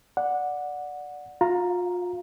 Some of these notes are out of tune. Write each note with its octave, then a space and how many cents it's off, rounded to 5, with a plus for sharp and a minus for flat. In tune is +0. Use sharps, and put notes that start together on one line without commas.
D5 +0 F#5 -15
F4 +35 F5 -10 A#5 +0